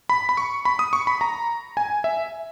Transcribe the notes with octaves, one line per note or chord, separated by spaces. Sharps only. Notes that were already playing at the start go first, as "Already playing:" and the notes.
B5
B5
C#6
B5
D#6
C#6
B5
A#5
G#5
E5